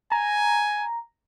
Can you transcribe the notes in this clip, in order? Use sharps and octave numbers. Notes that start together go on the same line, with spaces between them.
G#5 A#5